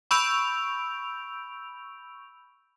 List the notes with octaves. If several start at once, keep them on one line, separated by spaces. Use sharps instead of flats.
B5 C#6 E6 G6 D7 F7